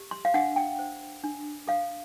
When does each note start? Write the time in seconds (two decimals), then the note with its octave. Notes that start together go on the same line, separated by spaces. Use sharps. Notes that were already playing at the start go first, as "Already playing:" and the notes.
Already playing: G4
0.11 C6
0.25 F5
0.34 D4 F#5
0.56 G5
0.79 C5
1.23 D4
1.68 A4 F5